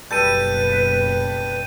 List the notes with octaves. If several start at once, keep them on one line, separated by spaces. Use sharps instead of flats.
F#1 B1 G3 A4 B4 G6 D#7